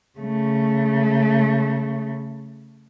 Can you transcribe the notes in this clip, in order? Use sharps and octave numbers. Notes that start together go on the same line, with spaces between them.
C#3 A3